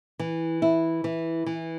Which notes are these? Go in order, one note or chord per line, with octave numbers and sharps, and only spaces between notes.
E3
E4
E3
E3